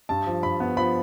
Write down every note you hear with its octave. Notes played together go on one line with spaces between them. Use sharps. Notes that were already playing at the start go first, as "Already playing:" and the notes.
G2 A5
F3
G2 B5
B3
F3 B5